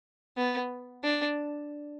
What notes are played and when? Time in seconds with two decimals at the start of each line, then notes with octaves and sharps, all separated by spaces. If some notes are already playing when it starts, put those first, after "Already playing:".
0.37 B3
1.04 D4